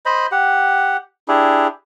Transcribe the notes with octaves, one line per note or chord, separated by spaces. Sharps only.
C5 D#5 B5
G4 F#5
D4 E4 G4 G#4